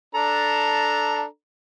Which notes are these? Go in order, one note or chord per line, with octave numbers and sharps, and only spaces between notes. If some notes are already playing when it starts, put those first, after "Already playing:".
D4 A4 A#5